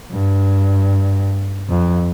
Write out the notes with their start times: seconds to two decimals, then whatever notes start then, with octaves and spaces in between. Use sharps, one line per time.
0.12 G2
1.70 F2